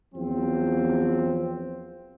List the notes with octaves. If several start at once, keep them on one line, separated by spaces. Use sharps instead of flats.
E2 F3 F#3 C4